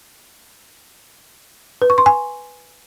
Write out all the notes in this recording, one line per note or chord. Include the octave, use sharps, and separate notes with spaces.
B4
C#6
C6
G#5